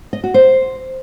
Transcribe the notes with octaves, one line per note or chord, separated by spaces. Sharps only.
D#5
F#4
C5